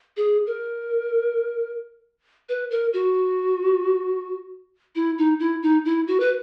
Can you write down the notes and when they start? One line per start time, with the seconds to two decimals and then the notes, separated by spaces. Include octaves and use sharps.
0.17 G#4
0.47 A#4
2.49 B4
2.71 A#4
2.93 F#4
4.95 E4
5.18 D#4
5.40 E4
5.62 D#4
5.85 E4
6.08 F#4
6.20 B4